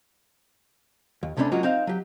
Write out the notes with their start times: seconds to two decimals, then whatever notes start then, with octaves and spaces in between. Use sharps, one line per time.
1.23 D#2
1.37 C2 C3 A3 C#4 D4 B5
1.52 F#3 G#3 A#3 C#4 F4 F#4
1.63 C4 D#4 F5
1.87 F#3 G4